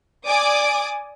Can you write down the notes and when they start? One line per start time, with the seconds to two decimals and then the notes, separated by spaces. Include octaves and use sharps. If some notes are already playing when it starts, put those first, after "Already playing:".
0.25 D5 G#5 D6 D#6